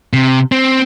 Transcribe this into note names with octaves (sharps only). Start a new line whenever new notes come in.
C3
C4